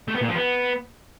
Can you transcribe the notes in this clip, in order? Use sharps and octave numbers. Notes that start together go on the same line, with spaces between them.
A3
B3
A#2
F3
B3